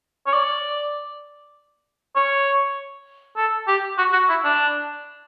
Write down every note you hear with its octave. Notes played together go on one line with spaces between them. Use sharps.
C#5
D5
C#5
A4
G4
F#4
F#4
E4
D4